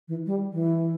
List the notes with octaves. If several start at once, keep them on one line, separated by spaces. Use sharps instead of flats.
E3
G3
E3